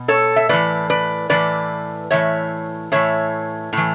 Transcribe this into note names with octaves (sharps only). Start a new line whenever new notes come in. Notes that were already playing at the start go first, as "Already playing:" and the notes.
Already playing: B2
A4 C#5
E5
A2 E3 B4 D5
B4 D5
A2 E3 B4 D5
A2 E3 C#5 E5
A2 E3 C#5 E5
A2 E3